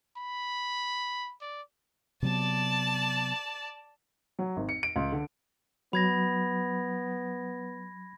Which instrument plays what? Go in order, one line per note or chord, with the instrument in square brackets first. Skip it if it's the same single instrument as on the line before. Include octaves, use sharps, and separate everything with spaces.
[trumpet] B5
D5
[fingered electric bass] C3 F#3 B3 [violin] D5 A5
[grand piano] F#3
G#1
C#7
D7
C#2
D3
[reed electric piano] F#3 [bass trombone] B3 [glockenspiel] B5 G#6 A#6